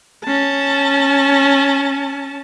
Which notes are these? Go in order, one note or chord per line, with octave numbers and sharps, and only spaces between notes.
C#4 A5